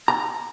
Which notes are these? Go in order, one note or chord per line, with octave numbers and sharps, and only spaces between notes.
A#5